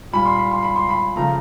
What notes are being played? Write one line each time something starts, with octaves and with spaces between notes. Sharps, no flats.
A#2 G3 B5
C6
B5
C6
B5
C6
B5
C#3 F3 A3 A#5